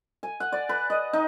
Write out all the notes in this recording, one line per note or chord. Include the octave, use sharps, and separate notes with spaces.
G#5
F#5
D5
B4
D#5
D#4